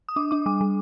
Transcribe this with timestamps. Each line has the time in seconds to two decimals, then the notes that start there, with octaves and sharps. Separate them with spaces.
0.09 D#6
0.16 D4 D6
0.31 D4 D6
0.46 G3 D6
0.61 G3